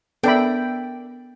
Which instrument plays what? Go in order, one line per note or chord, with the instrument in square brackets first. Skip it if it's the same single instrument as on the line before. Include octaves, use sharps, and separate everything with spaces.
[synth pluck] B3 [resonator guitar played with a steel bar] D4 A#4 E5 [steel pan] A4 D5 B5 [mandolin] G5